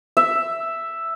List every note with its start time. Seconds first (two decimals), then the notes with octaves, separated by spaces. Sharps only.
0.17 E5